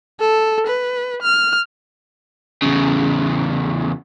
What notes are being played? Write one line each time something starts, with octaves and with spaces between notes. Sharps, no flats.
A4
B4
F6
E2 C#3